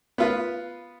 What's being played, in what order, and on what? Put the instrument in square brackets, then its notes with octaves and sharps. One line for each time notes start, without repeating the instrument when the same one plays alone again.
[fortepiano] B3 F4 B4